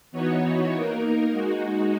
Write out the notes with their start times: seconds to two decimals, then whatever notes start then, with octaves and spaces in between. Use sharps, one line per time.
0.12 E3 B3 D#4 F#4 C#5
0.72 A#3 D#4 A#4
1.31 G#3 D#4 F#4